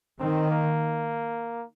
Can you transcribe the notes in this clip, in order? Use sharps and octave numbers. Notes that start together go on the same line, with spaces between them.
D#3 C4
A#3